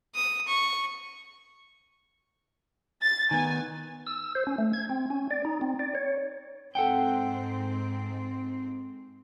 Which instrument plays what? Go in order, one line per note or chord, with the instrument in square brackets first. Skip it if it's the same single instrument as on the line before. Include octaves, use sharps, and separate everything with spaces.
[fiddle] D#6
C#6
[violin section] A6
[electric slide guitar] D#3 B3 [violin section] G#5
[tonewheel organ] E6
C5
C#4
A3
G#6
C4
C#4
D5
D#4
C4
D5
C#5
[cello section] G#2 C4 [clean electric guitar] A4 F#5 G5